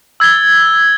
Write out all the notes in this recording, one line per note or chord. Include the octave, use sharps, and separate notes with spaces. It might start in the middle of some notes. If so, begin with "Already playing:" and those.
E6 G#6 A6 G7